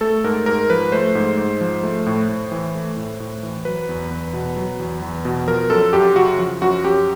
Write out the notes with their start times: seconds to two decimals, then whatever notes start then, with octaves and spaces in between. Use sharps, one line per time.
0.01 A3 A4
0.24 G#2 A#4
0.46 G#2 A#4
0.70 F3 B4
0.92 A3 C5
1.15 G#2
1.37 G#2
1.61 F3
1.83 A3
2.06 A2
2.29 A2
2.52 E3
2.75 A3
2.97 A2
3.20 A2
3.43 E3
3.65 F#3 B4
3.89 E2
4.11 E2
4.33 B2
4.56 F#3
4.79 E2
5.02 E2
5.25 B2
5.48 F3 A#4
5.70 F#2 A4
5.93 F#2 G4
6.15 C#3 F#4
6.39 F3
6.62 F#2 F#4
6.84 F#2 G4